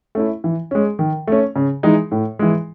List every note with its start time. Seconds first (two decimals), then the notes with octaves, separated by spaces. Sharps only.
0.15 A3 C#4 E4
0.44 E3
0.71 G#3 C#4
0.99 D#3
1.28 A3 C#4
1.56 C#3
1.83 E3 G#3 D#4
2.11 A2
2.39 E3 G#3